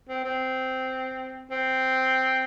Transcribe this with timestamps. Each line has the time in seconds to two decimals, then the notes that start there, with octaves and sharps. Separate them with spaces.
0.09 C4
0.24 C4
1.51 C4